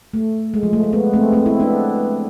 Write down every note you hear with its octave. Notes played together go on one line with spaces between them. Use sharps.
A3
G#3
F3
A3
A3
G#3 B3
A3 C4
A3 C4
C4 E4
B3 D4